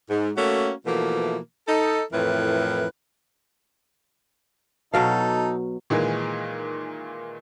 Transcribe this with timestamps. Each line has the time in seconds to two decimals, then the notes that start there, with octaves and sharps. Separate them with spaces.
0.09 G#2
0.36 A3 A#3 C#4 F#4
0.85 B2 E3 F3 A3 A#3
1.68 D#4 A4
2.13 F2 A2 E3 A#4 B4
4.94 B2 F#3 D#4 A4 F5
5.90 A#2 D#3 E3 G#3 A#3